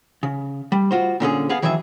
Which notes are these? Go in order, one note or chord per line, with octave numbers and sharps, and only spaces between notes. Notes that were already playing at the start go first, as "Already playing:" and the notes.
C#3
G3
F4 F#4 C5
A#2 D3 C#4 G#4
B3 G#4 F5
D#3 E3 F#3 G#4 E5